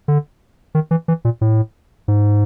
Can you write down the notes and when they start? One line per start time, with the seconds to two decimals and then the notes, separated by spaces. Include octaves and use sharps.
0.08 D3
0.75 D#3
0.91 E3
1.08 E3
1.25 A#2
1.41 A2
2.08 G#2